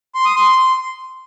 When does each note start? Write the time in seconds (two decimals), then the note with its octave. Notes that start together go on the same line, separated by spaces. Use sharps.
0.15 C6
0.25 D#6
0.36 C6